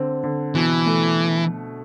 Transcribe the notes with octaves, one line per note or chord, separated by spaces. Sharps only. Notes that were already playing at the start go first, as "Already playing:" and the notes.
Already playing: D3 C4
D3
B2 E3
A3